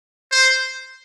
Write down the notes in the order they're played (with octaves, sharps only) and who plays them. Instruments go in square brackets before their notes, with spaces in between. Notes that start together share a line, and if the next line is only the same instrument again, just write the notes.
[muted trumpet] C5